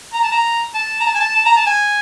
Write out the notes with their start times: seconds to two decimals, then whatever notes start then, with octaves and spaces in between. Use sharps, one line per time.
0.13 A#5
0.23 A5
0.32 A#5
0.75 A5
1.01 A#5
1.06 A5
1.15 G#5
1.20 A5
1.36 A5
1.46 A#5
1.57 A5
1.66 G#5